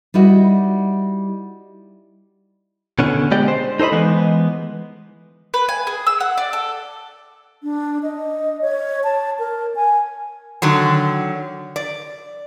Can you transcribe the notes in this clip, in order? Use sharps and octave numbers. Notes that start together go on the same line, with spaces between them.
G3 D#4 E4 F#4
B2 D3 C#4
G#3 B3 G4 D5 D#5 G5
C5
D#4 A4 C5 D#5 B5
E3 G#3 B3
B4
G#5
G#4
E6
F#5
D5
A4
D4
D#5
C#5
A5
A#4
G#5
D3 D#3 F#3
D5